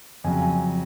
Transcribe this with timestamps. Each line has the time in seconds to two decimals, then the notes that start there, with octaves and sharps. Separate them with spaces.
0.24 F2 C#3 F#3 G#5
0.42 G#5